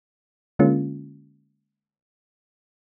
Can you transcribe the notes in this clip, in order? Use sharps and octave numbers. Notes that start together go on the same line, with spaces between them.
D3 G#3 A#3 C#4 F4